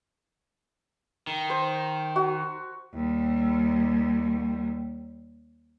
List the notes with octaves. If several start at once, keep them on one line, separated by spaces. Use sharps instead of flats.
D#3
C5
F#4
D#2 G3